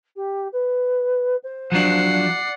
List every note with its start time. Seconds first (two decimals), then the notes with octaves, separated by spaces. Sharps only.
0.16 G4
0.52 B4
1.43 C5
1.72 F3 F#3 D4 F#5 C7
2.14 D5